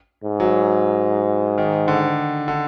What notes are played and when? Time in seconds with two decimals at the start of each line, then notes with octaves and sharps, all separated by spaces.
0.24 G#2
0.40 F#3
1.58 D#3
1.88 D3
2.48 D3